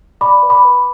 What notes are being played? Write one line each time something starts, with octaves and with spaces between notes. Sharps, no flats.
D5 B5 D6
B4
B5 D6
B4